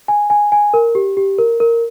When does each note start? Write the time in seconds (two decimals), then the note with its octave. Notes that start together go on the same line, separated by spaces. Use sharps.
0.08 G#5
0.30 G#5
0.52 G#5
0.74 A#4
0.95 G4
1.17 G4
1.38 A#4
1.60 A#4